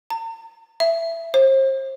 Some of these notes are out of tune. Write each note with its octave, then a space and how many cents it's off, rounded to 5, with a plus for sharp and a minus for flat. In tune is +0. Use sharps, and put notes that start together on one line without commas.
A#5 -45
E5 +15
C5 +35